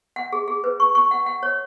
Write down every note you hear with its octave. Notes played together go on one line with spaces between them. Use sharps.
F#5
G#4
G#4
B4
C#6
C#6
F#5
F#5
C#5